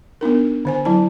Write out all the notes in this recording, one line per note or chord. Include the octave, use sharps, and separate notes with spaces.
B3 D4 D#4 A#4
D3 C5 G#5
F#3 E4 A5